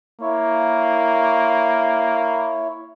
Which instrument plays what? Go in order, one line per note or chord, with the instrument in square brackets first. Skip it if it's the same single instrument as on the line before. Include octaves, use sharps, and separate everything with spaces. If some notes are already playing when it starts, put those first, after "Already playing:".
[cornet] A#3 [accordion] E4 C#5